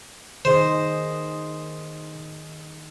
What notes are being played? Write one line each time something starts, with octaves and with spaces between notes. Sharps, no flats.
D#3 G#4 C5 D#5